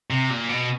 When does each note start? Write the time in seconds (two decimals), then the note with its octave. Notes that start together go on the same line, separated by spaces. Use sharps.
0.10 C3
0.30 A#2
0.49 B2